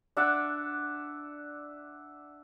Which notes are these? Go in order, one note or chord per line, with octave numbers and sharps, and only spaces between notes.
D4 E5 F#5 D6